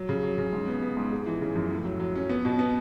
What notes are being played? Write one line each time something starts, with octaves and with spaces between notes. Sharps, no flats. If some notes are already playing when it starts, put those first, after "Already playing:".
Already playing: F#3
C#3
F#3
C#3
G#2
B3
B3
G#2
G#3
E3
C#3
F#2
A2
F#3
F#3
C#4
B3
B2
B3